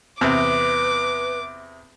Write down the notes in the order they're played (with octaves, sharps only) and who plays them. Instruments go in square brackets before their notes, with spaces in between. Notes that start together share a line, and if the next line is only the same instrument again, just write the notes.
[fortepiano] E2 C3 [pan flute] B4 [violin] D6